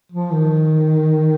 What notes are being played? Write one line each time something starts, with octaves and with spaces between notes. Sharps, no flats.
F3
D#3